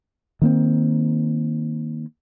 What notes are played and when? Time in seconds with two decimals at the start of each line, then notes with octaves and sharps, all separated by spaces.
0.42 D#3 A#3 C4